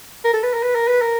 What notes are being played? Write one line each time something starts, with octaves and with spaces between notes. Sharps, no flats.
A#4
A4
B4
A#4
B4
A#4
B4
A#4